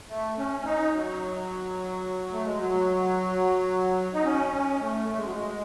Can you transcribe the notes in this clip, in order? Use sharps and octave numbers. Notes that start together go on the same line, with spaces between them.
A3
C#4
C#4
D#4
F#3
A3
G#3
F#3
D#4
C#4
C#4
A3
A3
G#3
F#3
G#3